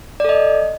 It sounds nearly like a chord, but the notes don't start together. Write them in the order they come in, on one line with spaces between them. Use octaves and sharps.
D5 A4 D#5